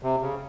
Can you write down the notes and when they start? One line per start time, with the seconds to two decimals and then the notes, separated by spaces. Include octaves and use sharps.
0.03 C3
0.22 C#3